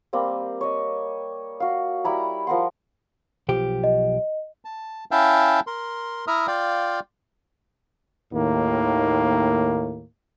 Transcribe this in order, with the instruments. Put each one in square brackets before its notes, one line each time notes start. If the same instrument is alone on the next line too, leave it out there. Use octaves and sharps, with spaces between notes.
[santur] G3 A#3 C4
C#5 D#5
F#4 F5
G3 E4 A#5 B5
F3 A#4 F#5 C6
[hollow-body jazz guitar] B1 F3 G4
[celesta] D#5
[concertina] A5
C#4 E4 E5 F5 G5 A5
A#4 C6
E4 E5 A#5 D#6 F6
F4 D5 F5 G5
[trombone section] D#2 A2 D#3 A#3